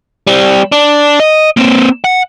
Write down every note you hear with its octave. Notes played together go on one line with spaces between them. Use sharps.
G3 C4
D4
D#5
A#3 C4
F#5